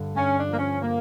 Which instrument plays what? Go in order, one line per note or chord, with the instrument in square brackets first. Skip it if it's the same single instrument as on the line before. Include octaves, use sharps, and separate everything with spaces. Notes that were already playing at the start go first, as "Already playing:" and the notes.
Already playing: [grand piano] G2 D3
[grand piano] G2 [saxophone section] C#4
[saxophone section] D4
[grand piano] F3 [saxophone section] A#3
[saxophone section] C#4
[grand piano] F3 [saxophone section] A#3